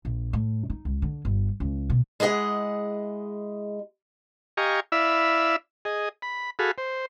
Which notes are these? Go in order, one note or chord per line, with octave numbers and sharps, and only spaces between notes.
A#1
A2
D#4
C#2
D3
G1
C#2
B2
G#3 E4 G#4 D#5 F#5
G4 D#5 F5 G#5 A#5 C#6
E4 D5 E5 F5 B5 E6
G#4 D#5
B5
F#4 G#4 A4 F5 B5
C5